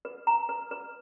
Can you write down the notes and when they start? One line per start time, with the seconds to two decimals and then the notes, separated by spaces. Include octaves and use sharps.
0.05 B4
0.27 A#5
0.49 B4
0.71 B4